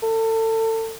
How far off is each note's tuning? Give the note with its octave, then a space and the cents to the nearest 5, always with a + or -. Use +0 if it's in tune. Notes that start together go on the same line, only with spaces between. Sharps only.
A4 +30